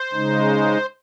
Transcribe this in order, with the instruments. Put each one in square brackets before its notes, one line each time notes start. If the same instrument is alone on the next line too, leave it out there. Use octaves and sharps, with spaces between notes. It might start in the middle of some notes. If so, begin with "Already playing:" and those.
Already playing: [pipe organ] C5
C#3 G#3 D#4